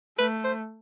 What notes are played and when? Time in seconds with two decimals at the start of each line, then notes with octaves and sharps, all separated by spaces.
0.18 A3 B4
0.44 C5